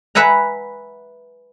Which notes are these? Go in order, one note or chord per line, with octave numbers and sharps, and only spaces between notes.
B4 E5 F#5 G#5 A#5